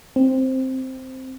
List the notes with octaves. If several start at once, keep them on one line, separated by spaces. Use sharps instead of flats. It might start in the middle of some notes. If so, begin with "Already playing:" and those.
C4